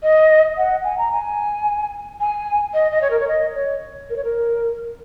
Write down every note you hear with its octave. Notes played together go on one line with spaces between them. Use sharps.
D#5
F#5
G#5
A#5
G#5
G#5
D#5
D#5
C#5
A#4
C#5
D#5
C#5
A#4
C#5
A#4